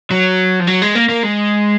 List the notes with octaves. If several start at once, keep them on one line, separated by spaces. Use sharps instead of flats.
F#3
F3
F#3
G#3
A#3
A#3
G#3